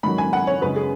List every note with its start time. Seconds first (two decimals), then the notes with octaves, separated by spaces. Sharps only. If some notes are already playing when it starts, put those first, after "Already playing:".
0.03 G#2 D#3 F#3 B5
0.18 G#5
0.33 F#5
0.47 C#5
0.61 F#2 C#3 G#3 B4
0.76 G#4